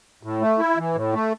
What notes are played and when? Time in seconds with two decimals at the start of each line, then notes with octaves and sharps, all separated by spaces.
0.23 A2
0.41 A3
0.59 E4
0.77 E3
0.95 A2
1.13 A3